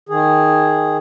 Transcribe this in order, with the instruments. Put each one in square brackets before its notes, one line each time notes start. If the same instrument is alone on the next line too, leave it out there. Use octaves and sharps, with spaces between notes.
[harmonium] D#3 G#4